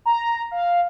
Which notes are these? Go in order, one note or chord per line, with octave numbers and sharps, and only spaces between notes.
A#5
F5